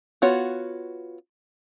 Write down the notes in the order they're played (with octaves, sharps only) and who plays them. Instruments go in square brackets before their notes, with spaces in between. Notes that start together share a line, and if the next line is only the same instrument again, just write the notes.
[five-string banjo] B3 F4 F#4 C#5